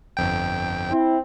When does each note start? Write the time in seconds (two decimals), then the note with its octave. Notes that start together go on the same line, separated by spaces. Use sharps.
0.17 G1 F2 G5
0.91 C4 E4